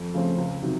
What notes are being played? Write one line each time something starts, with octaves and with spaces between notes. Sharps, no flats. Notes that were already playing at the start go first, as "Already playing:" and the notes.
Already playing: F2
C#3 F3 A3 C4
C#2
C3 D#3 F#3